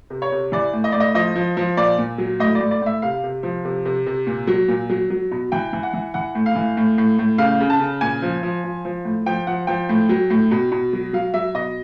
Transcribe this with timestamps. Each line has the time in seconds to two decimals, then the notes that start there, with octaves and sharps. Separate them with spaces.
0.10 C3
0.22 C#5
0.32 C3
0.52 E3 D5
0.73 A2
0.84 D#5
0.92 A2 D5
1.00 D#5
1.14 F3 D#5
1.36 F3
1.57 F3
1.77 A#2 D5
1.99 A#2
2.18 F#3
2.40 A2 D#5
2.55 D5
2.60 A2
2.71 D5
2.82 A2 E5
3.02 C3 F5
3.24 C3
3.43 F3
3.65 C3
3.85 C3
4.06 C3
4.27 A#2
4.47 F#3
4.68 A#2
4.89 F#3
5.10 F#3
5.32 B2
5.52 E3 G5
5.73 E3
5.83 F#5
5.94 E3
6.14 E3 F#5
6.35 A2
6.46 F5
6.55 E3
6.77 A2
6.98 A2
7.19 A2
7.38 C#3 F5
7.60 C#3
7.70 A5
7.80 C#3
8.01 A#2 G#5
8.22 F3
8.43 F3
8.64 F3
8.85 F3
9.05 A2
9.26 F3 G5
9.47 F3 F#5
9.67 F3 G5
9.89 A2
10.09 F#3
10.30 A2
10.51 B2
10.72 B2
10.93 F#3
11.13 F#3 F5
11.34 F#3 E5
11.54 B2 D#5